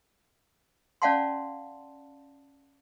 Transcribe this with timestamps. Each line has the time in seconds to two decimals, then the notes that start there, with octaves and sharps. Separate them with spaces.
1.02 C#4 D5 F5 F#5 A5 C6